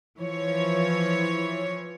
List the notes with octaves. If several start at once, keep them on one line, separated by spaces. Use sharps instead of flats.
E3 F3 C#5